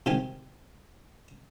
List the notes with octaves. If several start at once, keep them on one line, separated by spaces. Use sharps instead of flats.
C3 D#3 G4 G#5